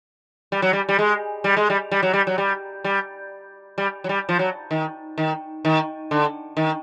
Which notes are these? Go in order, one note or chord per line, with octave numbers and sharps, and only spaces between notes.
G3
F#3
G3
G3
G#3
G3
G#3
G3
G3
F#3
G3
F#3
G3
G3
G3
F#3
G3
F3
F#3
D#3
D#3
D#3
D3
D#3